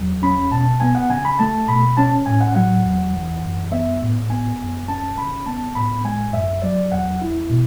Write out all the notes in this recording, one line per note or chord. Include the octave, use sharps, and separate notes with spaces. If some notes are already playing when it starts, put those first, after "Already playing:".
Already playing: E2 F#3
C#4 B5
B2 A5
B3 G#5
F#5
C#3 G#5
B5
A3 A5
B2 B5
C#4 A5
A2 G#5
F#5
F#3 F#5
E2
E3
F#2
B3 E5
A2
B3 G#5
F#2
C#4 A5
C#3 B5
B3 A5
A2 B5
G#3 G#5
F#2 E5
F#3 D5
E2 F#5
E4
B2